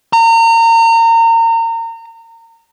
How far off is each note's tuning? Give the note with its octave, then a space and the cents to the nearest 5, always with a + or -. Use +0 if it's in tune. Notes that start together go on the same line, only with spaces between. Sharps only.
A#5 -30